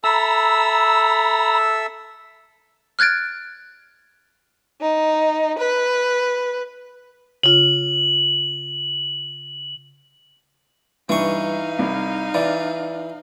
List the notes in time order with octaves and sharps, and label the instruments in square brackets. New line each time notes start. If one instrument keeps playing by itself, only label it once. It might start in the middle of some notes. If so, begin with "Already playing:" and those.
[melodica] A4 E5 E6 [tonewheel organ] A#5 B5
[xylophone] F6 F#6 G#6 A6 D7
[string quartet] D#4
B4
[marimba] C#3 F4 [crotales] F#7
[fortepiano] G2 [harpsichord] E3 C#6 [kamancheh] D#4 F5
[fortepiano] C2
[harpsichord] E3 [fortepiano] D5